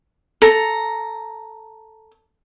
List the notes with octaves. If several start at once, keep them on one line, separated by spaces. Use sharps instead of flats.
A4 A#5